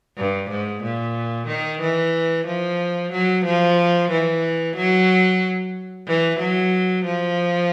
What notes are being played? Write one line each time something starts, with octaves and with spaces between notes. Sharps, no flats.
G2
G#2
A#2
D#3
E3
F3
F#3
F3
E3
F#3
E3
F#3
F3